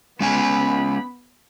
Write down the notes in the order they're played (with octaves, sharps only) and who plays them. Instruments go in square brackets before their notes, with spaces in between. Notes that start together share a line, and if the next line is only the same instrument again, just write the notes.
[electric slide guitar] G#3 C#4 G#5 [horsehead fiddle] B3 B5